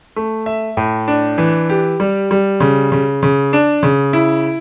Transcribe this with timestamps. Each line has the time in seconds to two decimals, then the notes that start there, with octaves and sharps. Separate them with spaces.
0.16 A3
0.46 E5
0.77 A2
1.08 D4
1.38 E3
1.70 G4
2.00 G3
2.31 G3
2.60 C#3
2.92 C#3
3.23 C#3
3.53 D4
3.83 C#3
4.13 E4